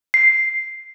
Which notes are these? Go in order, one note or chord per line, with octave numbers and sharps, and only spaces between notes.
C7